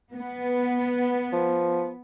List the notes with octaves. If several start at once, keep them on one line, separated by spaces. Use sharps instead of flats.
B3
F3